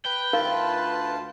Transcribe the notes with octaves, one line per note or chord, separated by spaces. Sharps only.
B4 G5
D2 D#4 F4 A#4 F5 A5